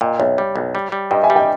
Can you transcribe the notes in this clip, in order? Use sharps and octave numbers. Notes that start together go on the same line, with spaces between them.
A#2 D#5 G5
B1 C#5 E5
G3
B1
G3
G3
G2 D#5 G5
E5 G#5
G3
D#5 G5